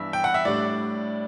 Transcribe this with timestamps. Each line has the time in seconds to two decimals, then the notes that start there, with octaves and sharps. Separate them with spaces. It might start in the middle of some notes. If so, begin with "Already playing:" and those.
Already playing: G2 E3 B3 D4 E5
0.13 G5
0.24 F#5
0.34 E5
0.45 A2 G3 D4 D5